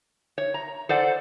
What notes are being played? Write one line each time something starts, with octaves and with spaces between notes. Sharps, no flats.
C#5
A#5
A4 C5 D5 F#5